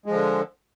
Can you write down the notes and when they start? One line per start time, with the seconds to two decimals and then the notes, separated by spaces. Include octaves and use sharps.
0.06 G#3
0.10 F3
0.13 D3